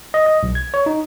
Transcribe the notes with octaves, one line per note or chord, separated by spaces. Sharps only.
D#5
D#5
B1
G#6
C#5
D#4